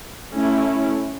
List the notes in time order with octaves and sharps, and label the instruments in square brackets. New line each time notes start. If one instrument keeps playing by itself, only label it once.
[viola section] A3 C#4 E4